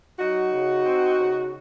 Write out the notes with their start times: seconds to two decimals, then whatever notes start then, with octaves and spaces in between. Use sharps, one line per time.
0.19 F#3 D#4 F#4
0.52 C#3
0.84 C4
1.17 C#3